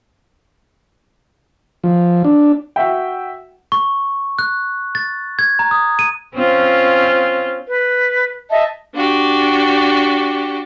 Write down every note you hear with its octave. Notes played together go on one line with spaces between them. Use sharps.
F3
D4
F#4 E5 G5
C#6
F#6
A6
G#6
A#5
D#6
D#7
C4 C#4 F4
B4
D#5 E5 A5
D4 F#4 G4